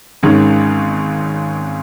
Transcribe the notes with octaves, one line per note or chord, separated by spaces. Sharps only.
G#1 G#2 D#3 G#3 C#4